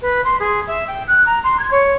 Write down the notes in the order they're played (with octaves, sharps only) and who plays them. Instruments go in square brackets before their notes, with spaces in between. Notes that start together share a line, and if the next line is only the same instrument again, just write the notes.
[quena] B4
C6
G#4
E5
G5
F#6
A#5
C6
G#6
C#5